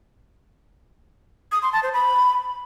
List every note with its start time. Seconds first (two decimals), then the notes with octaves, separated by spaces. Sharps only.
1.52 D#6
1.62 C6
1.73 A5
1.83 C5
1.93 B5